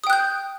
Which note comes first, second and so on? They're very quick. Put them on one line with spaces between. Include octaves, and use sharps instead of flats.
D#6 G5 F#6 G6